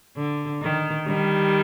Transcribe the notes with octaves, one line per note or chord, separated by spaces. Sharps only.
D3
D#3
D#3 G3